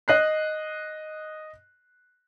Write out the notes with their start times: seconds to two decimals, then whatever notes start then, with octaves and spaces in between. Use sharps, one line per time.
0.08 D#5 F#6 C7